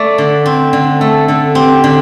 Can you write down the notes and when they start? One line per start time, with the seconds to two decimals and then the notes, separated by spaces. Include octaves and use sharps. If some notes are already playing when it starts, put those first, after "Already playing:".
Already playing: A3 D5
0.18 D3
0.46 C4
0.73 D3
1.00 A3 A4
1.28 D3
1.55 C4 G4
1.84 D3